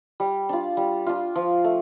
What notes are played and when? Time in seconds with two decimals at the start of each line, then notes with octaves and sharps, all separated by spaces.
0.20 G3
0.49 D4 F4
0.77 G3
1.07 D4 F4
1.35 F3
1.64 A3